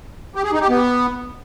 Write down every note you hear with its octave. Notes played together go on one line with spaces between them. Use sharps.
G4
G#4
D#4
G4
B3